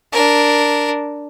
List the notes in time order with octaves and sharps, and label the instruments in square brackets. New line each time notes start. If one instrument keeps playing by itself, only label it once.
[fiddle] D4 A#4